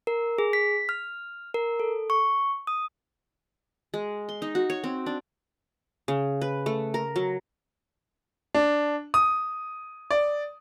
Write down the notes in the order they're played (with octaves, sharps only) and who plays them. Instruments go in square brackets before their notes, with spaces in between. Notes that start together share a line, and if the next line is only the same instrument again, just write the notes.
[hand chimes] A#4
G#4
B6
F6
A#4
A4
C#6
D#6
[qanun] G#3
C6
D#4
F#4
C#5
C4
D4
C#3
B4
A3
A#4
F#3
[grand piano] D4
D#6
D5